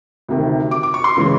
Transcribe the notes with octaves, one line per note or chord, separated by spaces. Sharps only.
D2 C3 D#3
D6
D6
C#6
C6
C#3 E3 G#3